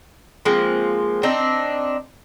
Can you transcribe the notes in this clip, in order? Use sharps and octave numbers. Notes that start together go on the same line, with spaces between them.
F3 G#3 A#3 C4
C4 D4 D#4